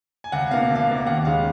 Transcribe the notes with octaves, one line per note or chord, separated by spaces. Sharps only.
G#5
C#2 F#5
B2 A#3 F5
C#2
F5
B2 A#3
D#2 F#5
C#3 G#3 F5